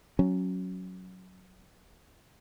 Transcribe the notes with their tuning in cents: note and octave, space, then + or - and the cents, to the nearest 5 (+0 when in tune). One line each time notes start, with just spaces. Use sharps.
F#3 +0 C#4 +0